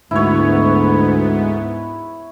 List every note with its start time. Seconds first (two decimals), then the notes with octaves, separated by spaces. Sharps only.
0.11 D2 G#2 B3 E4 C#5